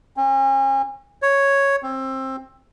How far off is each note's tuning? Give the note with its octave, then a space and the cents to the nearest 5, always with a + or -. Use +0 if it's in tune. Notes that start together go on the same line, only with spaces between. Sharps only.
C#4 -40
C#5 +0
C4 +20